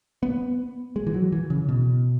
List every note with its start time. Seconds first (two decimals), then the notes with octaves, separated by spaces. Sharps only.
0.23 B3
0.96 G#3
1.07 E3
1.14 F#3
1.32 E3
1.50 C#3
1.69 B2